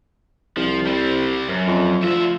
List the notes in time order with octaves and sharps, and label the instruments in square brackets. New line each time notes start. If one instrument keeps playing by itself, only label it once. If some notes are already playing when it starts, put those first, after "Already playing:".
[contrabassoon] C2 [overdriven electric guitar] F3
[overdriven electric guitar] G3 C4
F#2
[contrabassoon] F2
[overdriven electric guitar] D2 E5 [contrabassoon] F3